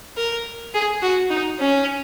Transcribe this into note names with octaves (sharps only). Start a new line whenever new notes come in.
A#4
G#4
F#4
D#4
C#4